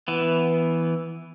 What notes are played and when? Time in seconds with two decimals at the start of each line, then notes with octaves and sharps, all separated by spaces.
0.08 E3 B3